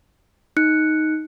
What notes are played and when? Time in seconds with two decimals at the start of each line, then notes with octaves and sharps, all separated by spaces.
0.57 D#4 F#6 C#7